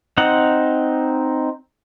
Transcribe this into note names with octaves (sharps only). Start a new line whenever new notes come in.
C4 D#4 F#5